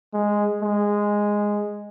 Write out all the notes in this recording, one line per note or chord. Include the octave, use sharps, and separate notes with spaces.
G#3
G#3